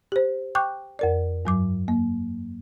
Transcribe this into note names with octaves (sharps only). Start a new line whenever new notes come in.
G4 C5
G5 C#6 D6 F#6 G6
F2 A#4 D5
G2 F#3 D6
A#3